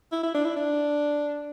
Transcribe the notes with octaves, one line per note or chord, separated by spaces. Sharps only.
E4
E4
D4
E4
D4